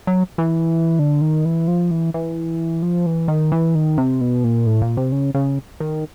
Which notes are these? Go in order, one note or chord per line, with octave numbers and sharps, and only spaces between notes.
F#3
E3
D3
D#3
E3
F3
E3
E3
F3
E3
D#3
E3
D#3
C3
B2
A#2
A2
A#2
C3
C#3
C#3
D#3